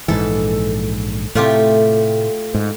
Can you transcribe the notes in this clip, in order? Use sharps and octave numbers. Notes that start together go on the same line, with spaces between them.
A#1 G#2 E3 A4
A2 C3 A3 F4 G4
G#2